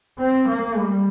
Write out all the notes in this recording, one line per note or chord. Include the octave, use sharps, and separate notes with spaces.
C4
A#3
G3